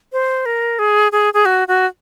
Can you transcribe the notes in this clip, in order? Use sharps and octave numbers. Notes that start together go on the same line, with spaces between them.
C5
A#4
G#4
G#4
G#4
F#4
F#4